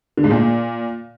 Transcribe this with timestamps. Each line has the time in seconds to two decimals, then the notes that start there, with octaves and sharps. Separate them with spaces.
0.17 D3
0.24 G#2
0.31 A#2